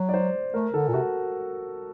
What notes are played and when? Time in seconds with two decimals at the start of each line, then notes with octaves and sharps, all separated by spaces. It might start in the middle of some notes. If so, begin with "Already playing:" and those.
Already playing: F#3
0.09 D5
0.14 C5
0.54 A3 A#4
0.73 D3 A4
0.88 A#2
0.94 C3 F#4